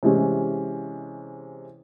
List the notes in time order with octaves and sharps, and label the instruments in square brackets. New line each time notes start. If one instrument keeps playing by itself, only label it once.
[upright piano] C3 E3 G#3 C#4